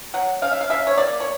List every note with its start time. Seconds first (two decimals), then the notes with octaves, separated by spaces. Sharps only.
0.14 F#3 F#5
0.42 C#3 F5
0.51 E5
0.61 F5
0.70 C#3 E5
0.87 C#5
0.97 A#3 D5
1.20 C#5